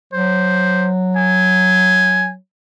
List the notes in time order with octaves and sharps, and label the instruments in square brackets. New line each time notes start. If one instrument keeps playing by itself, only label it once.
[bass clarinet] F#3 [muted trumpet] C5
[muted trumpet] G#5